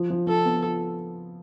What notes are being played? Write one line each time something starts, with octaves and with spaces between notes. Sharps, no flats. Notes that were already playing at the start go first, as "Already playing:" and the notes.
Already playing: F3
F3
F3 A4
B3
F4